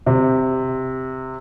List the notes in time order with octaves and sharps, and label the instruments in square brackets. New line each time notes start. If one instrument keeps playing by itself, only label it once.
[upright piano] C3